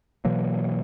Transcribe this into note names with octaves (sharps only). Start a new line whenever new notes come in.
B2 E3 F#3 A#3